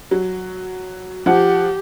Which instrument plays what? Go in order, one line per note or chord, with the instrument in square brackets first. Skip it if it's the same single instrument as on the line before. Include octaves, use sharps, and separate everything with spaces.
[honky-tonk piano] F#3
[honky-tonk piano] F3 F#5 [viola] G4